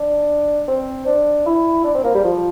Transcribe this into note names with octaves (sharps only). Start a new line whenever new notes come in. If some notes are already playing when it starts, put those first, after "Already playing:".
Already playing: D4
C4
D4
E4
D4
C4
A#3
G3
F3